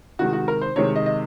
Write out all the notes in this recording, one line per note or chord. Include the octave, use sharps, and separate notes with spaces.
C3 D#3 G#3 F#4
F#4
A#4
C5
C3 D#3 G#3 C#5
D#5
D#5